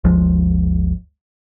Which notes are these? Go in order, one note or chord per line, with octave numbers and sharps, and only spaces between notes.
G1 D2 F3 G#3